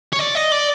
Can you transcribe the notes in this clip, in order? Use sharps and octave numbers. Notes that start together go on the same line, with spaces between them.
C#5
D5
D#5
D5